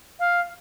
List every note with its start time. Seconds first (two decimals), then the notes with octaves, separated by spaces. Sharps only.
0.20 F5